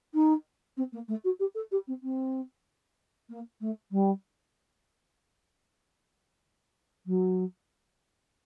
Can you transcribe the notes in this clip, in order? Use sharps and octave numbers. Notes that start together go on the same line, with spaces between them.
D#4
C4
A#3
A3
F#4
G4
A4
G4
C4
C4
A#3
A3
G3
F#3